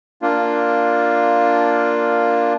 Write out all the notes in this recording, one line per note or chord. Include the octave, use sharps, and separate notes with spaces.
A#3 D4 F4